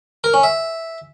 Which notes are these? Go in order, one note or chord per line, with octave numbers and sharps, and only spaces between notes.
A#4
C#4
E5